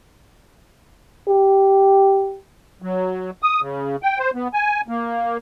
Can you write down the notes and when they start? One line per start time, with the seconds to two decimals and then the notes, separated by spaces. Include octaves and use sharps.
1.28 G4
2.82 F#3
3.42 D#6
3.61 C#3
4.03 G5
4.19 C5
4.35 B3
4.54 G#5
4.88 A#3